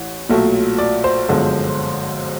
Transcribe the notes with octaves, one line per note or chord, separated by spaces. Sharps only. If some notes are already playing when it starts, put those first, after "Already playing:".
Already playing: A1 E3
B1 A#2 F#3 A3
D5
C5
G1 F#2 D3 F3 G#3